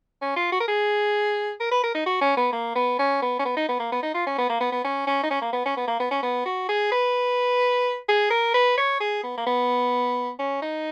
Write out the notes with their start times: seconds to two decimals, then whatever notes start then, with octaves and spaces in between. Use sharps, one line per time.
0.22 C#4
0.36 F4
0.52 F#4
0.60 A#4
0.68 G#4
1.60 A#4
1.71 B4
1.83 A#4
1.94 D#4
2.06 F#4
2.21 C#4
2.37 B3
2.53 A#3
2.75 B3
2.99 C#4
3.22 B3
3.39 C#4
3.45 B3
3.57 D#4
3.68 B3
3.79 A#3
3.92 B3
4.03 D#4
4.14 F4
4.26 C#4
4.38 B3
4.49 A#3
4.61 B3
4.72 B3
4.84 C#4
5.07 C#4
5.23 D#4
5.30 C#4
5.41 A#3
5.53 B3
5.65 C#4
5.77 B3
5.88 A#3
5.99 B3
6.11 C#4
6.23 B3
6.45 F#4
6.69 G#4
6.92 B4
8.08 G#4
8.30 A#4
8.54 B4
8.77 C#5
9.00 G#4
9.23 B3
9.38 A#3
9.46 B3
10.39 C#4
10.62 D#4